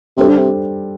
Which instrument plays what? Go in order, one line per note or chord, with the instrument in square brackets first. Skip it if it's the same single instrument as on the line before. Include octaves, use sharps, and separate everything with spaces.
[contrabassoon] C3 [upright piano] G3 D4 A4 C5
[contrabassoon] D3
C3